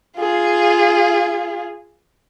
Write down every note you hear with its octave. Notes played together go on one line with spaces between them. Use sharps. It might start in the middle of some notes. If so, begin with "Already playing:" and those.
F4 G#4